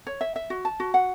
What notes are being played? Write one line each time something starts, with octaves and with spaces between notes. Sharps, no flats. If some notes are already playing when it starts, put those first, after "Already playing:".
C#5
E5
E5
F#4
A5
F#4
F#5